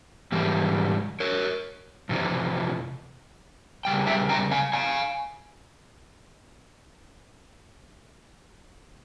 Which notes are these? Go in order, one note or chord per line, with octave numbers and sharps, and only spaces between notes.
G#2 E3 G3
A#4 C#5
F2 C3 E3
C#3 G3 G5
E5 G5
G5 A#5
F5 G#5
F5 G#5